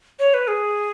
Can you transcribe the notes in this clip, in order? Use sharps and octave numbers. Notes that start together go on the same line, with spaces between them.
C#5
B4
G#4